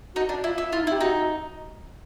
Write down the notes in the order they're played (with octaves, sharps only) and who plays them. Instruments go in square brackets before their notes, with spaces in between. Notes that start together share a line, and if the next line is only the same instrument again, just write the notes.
[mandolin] D#4 [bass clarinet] F#4
[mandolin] D4
[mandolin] E4 [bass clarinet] F4
[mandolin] E4
[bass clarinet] E4 [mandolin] F4
[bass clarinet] D#4
[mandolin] E4
[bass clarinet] G4
[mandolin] D#4 [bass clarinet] F#4